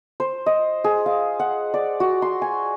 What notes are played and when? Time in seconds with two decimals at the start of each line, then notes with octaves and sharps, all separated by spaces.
0.20 C5
0.46 D#5
0.84 G#4
1.06 F5
1.39 F#5
1.74 D5
2.00 F#4
2.22 C6
2.42 G#5